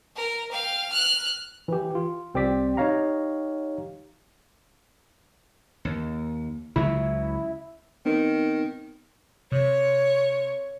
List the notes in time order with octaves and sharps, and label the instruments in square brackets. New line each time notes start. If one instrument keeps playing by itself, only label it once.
[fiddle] A#4
F5 G5
F6 F#6
[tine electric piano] E3 G4
F4
C2 C4 G4 D5 D6 B6
D#4 G4 C#5 F5 A#5
[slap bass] D#2
[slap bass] C#2 C#3 F#3 [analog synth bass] E4
[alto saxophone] D#3 [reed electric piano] B3 C4 D#4
[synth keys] C3 [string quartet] C#5